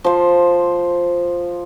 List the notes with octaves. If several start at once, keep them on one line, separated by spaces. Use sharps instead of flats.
F3 C5